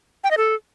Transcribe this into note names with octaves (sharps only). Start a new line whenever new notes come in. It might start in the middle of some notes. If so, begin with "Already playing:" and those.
G5
D#5
A4